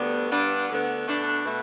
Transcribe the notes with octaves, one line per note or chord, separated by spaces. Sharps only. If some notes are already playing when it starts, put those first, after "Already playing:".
Already playing: D2 D3 G3 B3
G2 G3 B3 D4
D2 D3 B3
B2 A3 D4
B2 A3